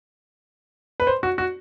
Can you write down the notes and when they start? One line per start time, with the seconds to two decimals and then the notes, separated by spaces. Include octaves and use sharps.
1.00 B4
1.07 C5
1.23 F#4
1.38 F#4